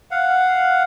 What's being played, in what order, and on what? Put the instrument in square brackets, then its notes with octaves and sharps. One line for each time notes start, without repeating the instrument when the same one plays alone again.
[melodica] F5 F#5